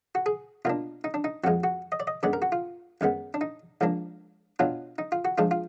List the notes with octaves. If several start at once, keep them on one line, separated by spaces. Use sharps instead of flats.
F#4
G#4
B2 A#3 D4 F4
D#4
D4
D#4
F2 F3 G#3 F#4
F#4
D#5
D5
D#5
F#2 D3 G#3 B3 D5
A#4
F#4
F4
F#2 D#3 G#3 B3
D4
D#4
G#2 F3 A#3 D4
B2 F#3 D4 F4
D#4
F4
F#4
G#2 F3 G#3 D4 F4
F4